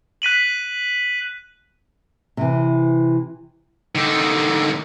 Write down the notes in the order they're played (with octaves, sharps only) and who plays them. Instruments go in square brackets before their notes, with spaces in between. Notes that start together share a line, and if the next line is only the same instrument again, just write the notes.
[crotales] F#6 B6 D#7 F#7
[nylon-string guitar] C3 E3
[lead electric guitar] D3 D#3